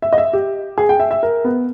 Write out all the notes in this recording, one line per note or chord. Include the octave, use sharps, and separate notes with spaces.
E5
D#5
E5
G4
G#4
G5
E5
E5
A#4
B3